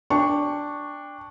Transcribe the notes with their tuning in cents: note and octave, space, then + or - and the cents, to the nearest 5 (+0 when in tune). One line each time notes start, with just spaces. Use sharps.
D4 +0 G5 +25 C#6 +0